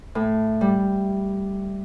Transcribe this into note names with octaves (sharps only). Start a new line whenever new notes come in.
A2
G3